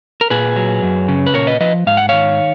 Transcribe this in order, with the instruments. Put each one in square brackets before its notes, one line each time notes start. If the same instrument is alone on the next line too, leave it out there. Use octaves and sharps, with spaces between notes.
[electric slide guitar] A#4
A#2 G#4 B4
F#3
F#2
C#3
B4
A#2 A#4 C#5
B4 D#5
F3 B4 D#5
G#2 F5
F#5
D#3 C#5 F5